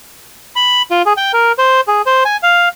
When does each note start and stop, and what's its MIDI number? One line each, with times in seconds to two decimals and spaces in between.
0.56 0.82 83
0.91 1.02 65
1.06 1.13 68
1.17 1.32 79
1.33 1.52 70
1.59 1.81 72
1.88 2.02 68
2.06 2.24 72
2.25 2.37 80
2.43 2.69 77